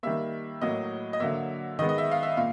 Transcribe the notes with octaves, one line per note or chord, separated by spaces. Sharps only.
D#3 G3 A#3 E5
A2 F#3 A#3 D#5
D#5
D3 F#3 A#3 E5
D#3 G#3 B3 D#5
D#5
E5
F5
E5
A#2 F5